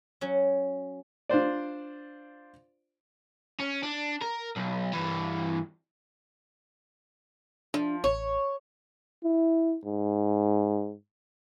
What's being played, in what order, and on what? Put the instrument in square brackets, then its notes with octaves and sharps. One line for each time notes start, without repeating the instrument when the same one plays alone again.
[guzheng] F#3 C#4
[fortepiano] D4 F4 C5 D5
[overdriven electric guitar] C#4
D4
A#4
B1
G2 E3
[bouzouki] F3 [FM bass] D4
[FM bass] A1 [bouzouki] C#5
[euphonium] E4
G#2